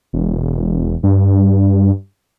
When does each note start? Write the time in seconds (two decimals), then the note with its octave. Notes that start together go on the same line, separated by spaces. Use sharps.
0.13 E1
1.03 G2